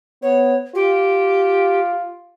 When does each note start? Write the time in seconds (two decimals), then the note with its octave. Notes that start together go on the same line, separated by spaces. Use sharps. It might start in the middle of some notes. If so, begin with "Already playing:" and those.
0.22 B3 C#5
0.75 F4 G4